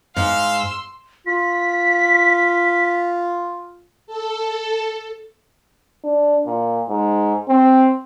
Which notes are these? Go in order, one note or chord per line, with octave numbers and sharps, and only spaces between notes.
G#2 F5 C6 E6
F4 B6
A4
D4
A#2
G#2
C4